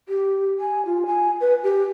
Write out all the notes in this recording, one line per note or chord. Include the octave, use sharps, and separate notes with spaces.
G4
G#5
F4
G#5
B4
G4